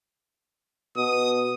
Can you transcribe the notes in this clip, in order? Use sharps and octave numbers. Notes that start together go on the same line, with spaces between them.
B2 D#6